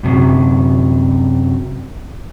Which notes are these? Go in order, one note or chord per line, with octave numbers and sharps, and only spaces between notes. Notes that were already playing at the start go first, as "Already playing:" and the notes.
F#2 C3 F#3